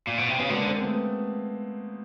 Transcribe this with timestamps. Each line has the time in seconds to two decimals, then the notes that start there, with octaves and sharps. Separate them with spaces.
0.07 A#2
0.18 B2
0.29 C3
0.38 C#3 B3
0.49 D3 G#3 A#3
0.66 A#3 C4
0.82 A3 B3